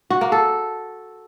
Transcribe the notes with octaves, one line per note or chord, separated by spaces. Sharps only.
F#4
A#3
A4